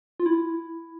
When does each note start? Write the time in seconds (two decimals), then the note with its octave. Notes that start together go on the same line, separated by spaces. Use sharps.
0.20 F4
0.26 E4